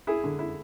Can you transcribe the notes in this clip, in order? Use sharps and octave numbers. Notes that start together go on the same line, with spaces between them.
E4 G#4
D3
E4